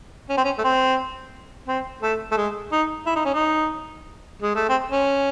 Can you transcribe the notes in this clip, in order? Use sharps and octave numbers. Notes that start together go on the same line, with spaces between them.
C#4
C4
C#4
A3
C4
C4
A3
A3
G#3
D#4
E4
D#4
C#4
D#4
G#3
A3
C4
C#4